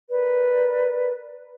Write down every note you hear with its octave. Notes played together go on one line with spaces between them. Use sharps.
A#4 B4 D5